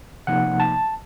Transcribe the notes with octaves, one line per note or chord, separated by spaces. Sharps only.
C3 F3 A#3 D#4 F#5
A5